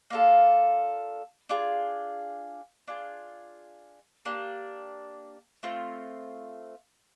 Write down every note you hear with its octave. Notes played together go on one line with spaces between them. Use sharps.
A#3 D4 F4 A4
D4 F4 G#4
D4 F4 G#4
A#3 D4 G4
A3 C4 F4